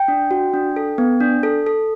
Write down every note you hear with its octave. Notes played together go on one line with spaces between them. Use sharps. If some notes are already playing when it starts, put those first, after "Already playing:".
Already playing: G5
D4
F#4
D4
A4
B3
D4
A4
A4